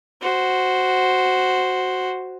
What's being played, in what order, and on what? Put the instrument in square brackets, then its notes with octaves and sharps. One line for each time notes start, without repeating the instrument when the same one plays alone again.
[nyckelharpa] F#4 C5